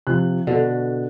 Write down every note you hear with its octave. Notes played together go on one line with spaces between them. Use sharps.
C3 F3 F#6
B2 D3